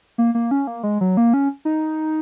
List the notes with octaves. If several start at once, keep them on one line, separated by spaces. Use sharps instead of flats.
A#3
A#3
C#4
A#3
G#3
F#3
A#3
C#4
D#4